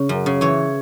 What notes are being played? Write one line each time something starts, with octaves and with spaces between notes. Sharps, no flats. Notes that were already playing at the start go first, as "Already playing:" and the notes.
Already playing: C#3
F#2
C#3
E3 C#5